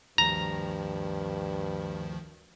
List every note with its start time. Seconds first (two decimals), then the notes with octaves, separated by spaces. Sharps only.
0.18 D2 G2 D#3 F3 A#5